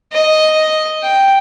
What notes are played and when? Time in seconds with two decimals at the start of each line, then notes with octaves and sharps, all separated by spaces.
0.12 D#5
1.03 G5